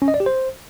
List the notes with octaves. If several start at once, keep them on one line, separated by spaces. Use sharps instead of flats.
C#4
D#5
D5
G4
C5